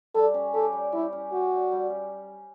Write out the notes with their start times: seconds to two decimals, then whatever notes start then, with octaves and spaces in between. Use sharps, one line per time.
0.15 G3 A4
0.34 C#4
0.54 G4 A4
0.73 G3
0.92 G3 E4
1.13 C#4
1.32 F#4 G4
1.51 G3
1.71 G3
1.90 C#4